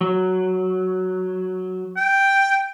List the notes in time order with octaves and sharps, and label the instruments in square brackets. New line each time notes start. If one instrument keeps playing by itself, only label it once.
[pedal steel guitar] F#3
[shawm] G5